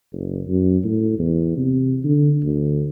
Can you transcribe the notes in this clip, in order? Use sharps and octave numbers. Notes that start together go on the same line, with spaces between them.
F#1
F#2
A2
E2
C3
D3
D2